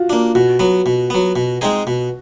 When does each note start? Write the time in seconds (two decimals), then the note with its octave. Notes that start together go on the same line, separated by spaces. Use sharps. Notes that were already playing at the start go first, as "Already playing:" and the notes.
Already playing: F4 F#4
0.10 A#3 D4
0.35 B2 F#4
0.59 F#3 B3
0.86 B2
1.10 F#3 B3
1.36 B2
1.61 G#3 C4 D#4 G#4
1.87 B2